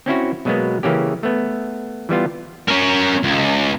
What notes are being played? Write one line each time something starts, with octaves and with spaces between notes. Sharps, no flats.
C4 C#4 E4 F#4
B2 F#3 G#3 A#3 B3
C#3 E3 A#3 C#4 G4
A3 B3
E3 G3 B3 F4
C#4 A#4
C#2